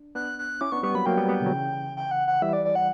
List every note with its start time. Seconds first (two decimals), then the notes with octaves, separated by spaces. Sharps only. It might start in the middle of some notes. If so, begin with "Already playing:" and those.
Already playing: D4
0.15 B3 D4 F#6
0.39 F#6
0.61 C#4 E4 D6
0.72 B3 D4 C#6
0.83 G3 B3 C#6
0.95 F#3 A#3 B5
1.06 F#3 A#3 G5
1.18 G3 B3
1.29 G3 B3
1.40 B2 D3
1.46 F#3
1.52 C#3 E3
1.97 G5
2.11 F#5
2.27 F#5
2.42 E3 G3 E5
2.53 D5
2.65 D5
2.75 F#5